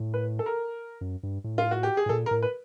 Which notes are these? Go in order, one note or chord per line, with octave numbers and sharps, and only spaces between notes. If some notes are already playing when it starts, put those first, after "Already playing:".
Already playing: A2
B4
A4
A#4
F#2
G2
A2
F4
F#4
G4
G#4
A2
A#2 A4
A#4
A2
B4